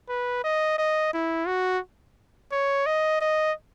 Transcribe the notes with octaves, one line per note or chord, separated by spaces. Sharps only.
B4
D#5
D#5
E4
F#4
C#5
D#5
D#5